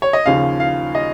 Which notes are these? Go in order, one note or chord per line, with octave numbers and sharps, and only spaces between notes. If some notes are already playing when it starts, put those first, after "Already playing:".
C#5
D#5
D#2 C#3 F3 F5
F5
D#5